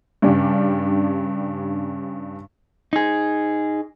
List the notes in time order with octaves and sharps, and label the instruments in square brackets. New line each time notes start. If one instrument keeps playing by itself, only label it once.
[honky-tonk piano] G2 C#3 D4 G4
[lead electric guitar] D#4 G#4